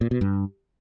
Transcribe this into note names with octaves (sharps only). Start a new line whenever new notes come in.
A#2
B2
G2